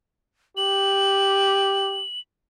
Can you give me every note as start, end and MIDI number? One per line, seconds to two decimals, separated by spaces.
0.57 2.04 67
0.57 2.20 102